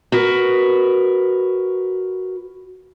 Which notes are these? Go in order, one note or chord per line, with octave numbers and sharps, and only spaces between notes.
F#4 A#4 B4